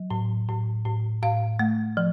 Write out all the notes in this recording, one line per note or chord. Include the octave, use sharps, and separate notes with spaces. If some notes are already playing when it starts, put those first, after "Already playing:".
Already playing: F#3
A2
A2
A2
A2 F5
A3
F3